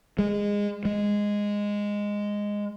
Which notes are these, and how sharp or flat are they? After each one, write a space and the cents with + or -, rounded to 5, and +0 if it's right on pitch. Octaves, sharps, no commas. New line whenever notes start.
G#3 -20
G#3 -10